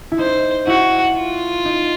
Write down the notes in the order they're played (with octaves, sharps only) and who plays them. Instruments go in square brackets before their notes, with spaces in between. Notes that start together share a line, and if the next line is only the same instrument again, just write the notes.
[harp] E4
[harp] D#4 [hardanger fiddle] C5
[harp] E4 [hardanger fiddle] F#4
[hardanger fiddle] F4
[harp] D#4